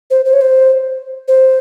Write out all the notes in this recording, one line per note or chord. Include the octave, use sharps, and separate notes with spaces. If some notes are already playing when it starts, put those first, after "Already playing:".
C5
C5
C#5
C5
C5